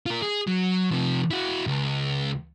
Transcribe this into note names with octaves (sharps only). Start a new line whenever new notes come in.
F4 A#4
G#4
F#3
C3 F3
E4 F#4
C#2